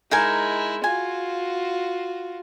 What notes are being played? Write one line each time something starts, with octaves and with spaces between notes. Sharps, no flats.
G#3 D#4 E4 A#4 G#5
F4 F#4 G#5